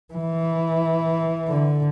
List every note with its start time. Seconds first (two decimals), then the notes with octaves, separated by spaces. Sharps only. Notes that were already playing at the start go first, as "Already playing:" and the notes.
0.14 E3
1.48 D3